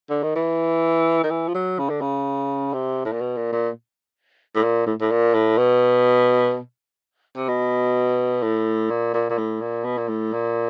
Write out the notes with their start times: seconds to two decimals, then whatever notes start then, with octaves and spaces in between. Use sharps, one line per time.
0.10 D3
0.23 D#3
0.36 E3
1.24 D#3
1.31 E3
1.48 F3
1.55 F#3
1.79 C#3
1.89 D3
2.01 C#3
2.73 C3
3.05 A2
3.12 A#2
3.21 B2
3.37 A#2
3.53 A#2
4.55 A2
4.63 A#2
4.87 A2
5.01 A2
5.11 A#2
5.34 A2
5.58 B2
7.36 C3
7.48 B2
8.42 A2
8.90 A#2
9.14 A#2
9.30 A#2
9.38 A2
9.61 A#2
9.84 B2
9.97 A#2
10.09 A2
10.33 A#2